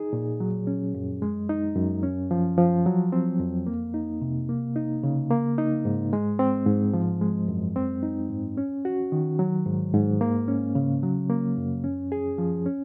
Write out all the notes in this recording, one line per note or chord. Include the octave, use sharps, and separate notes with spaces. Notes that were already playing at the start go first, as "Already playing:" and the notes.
Already playing: D#4 G#4
A#2
F#3
C#4
F#2
G#3
D#4
F#2
C#4
F3
F3
F#3
C4
F2
A#3
D#4
C3
A#3
D#4
C#3
A#3
D#4
G#2
G#3
C4
G#2
F3
G#3
F#2
C4
D#4
G#2
C#4
F#4
D#3
F#3
G#2
G#2
A#3
C#4
C#3
F#3
A#3
F#2
C#4
G#4
F3
C#4